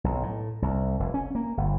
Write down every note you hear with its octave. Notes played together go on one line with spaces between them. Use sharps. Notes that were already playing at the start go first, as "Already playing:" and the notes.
B1
A2
C2
F1
C#4
A#3
G1